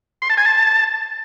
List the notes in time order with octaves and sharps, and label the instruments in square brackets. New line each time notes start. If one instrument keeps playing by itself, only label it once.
[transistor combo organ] C6
A5
G#5
A5